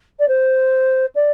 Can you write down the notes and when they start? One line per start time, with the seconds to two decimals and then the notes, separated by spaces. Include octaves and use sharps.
0.19 D5
0.28 C5
1.15 D5